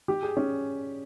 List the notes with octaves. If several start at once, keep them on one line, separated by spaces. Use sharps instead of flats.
G4
G#4
C#4